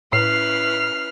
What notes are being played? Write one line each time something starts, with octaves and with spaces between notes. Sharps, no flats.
A2 C#4 E4 B4 F6 C7